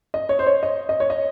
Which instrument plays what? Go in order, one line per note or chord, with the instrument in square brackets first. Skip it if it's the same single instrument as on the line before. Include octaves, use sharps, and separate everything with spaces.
[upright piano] D#5
C#5
C5
C#5
D#5
D#5
C#5
D#5